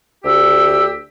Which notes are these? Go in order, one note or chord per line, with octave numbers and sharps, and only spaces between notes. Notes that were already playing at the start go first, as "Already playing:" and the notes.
D2 G4 E6